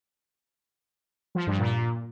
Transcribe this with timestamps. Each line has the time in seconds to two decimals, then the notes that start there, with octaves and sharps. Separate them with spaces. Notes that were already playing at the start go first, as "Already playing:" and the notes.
1.35 F3
1.47 G2
1.59 A#2